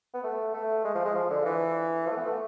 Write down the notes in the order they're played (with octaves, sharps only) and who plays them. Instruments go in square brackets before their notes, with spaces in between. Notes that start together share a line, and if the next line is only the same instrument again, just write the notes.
[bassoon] B3
A3
A3
G#3
F3
G#3
F3
D3
E3
F3
A3
B3
A3